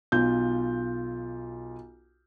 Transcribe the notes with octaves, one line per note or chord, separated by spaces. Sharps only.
B1 F4 G6